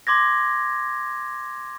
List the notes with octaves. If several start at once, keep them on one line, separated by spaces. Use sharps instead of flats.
C6 D6 G#6 A#6